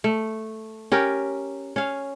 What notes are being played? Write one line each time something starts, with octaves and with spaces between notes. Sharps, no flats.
A3
C#4 G4 A#4
C#4 F5